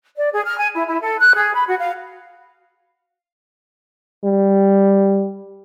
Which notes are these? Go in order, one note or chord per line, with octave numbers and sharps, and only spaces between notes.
D5
G#4
F6
G#5
E4
E4
A4
F#6
G#4
B5
F#4
F5
G3